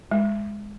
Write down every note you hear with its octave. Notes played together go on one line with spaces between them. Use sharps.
G#3